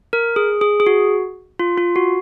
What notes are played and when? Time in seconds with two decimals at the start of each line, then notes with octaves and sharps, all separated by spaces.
0.13 A#4
0.36 G#4
0.61 G#4
0.80 G#4
0.87 F#4
1.59 F4
1.78 F4
1.96 F#4